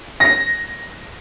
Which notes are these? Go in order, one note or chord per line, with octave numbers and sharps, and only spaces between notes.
A#6